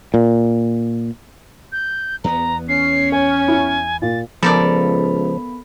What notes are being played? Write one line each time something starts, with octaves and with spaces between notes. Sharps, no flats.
A#2
G6
E2 B3 A#5
C#4 C7
C#5 G#5
E4
A#2 A6
C#2 F3 B3 A4 A#4 D5 B5